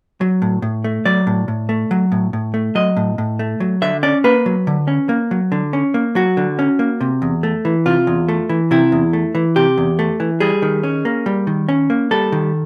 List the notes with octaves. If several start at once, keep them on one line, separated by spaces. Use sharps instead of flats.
F#3
A2
A2
A3
F#3 D5
A2
A2
A3
F#3
A2
A2
A3
F#3 D#5
A2
A2
A3
F#3
D3 E5
C#4 D5
A#3 B4
F#3
D3
C#4
A#3
F#3
D3
C#4
A#3
F#3 F#4
D3
C#4
A#3
C3
E2
A3
E3
C3 F4
E2
A3
E3
C3 E4
E2
A3
E3
C3 G4
E2
A3
E3
G3 G#4
D#3
C#4
A#3
G3
D#3
C#4
A#3
G3 A4
D#3